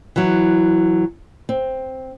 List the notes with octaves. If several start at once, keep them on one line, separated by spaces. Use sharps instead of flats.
E3 F#3
C4